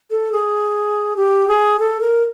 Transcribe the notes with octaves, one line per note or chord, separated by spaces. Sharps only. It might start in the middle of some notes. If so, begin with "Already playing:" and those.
A4
G#4
G4
G#4
A4
A#4